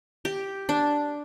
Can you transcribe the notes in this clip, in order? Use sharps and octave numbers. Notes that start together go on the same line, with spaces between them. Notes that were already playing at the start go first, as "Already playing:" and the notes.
G4
D4